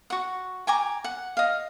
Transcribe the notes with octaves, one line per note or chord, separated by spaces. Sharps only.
F#4 F#5
G5 G#5 A#5 D6
F#5
D#5 F5